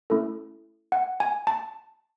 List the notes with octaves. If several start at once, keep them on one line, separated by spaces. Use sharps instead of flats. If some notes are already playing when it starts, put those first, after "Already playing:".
A3 C#4 E4 A4
F#5
G#5
A5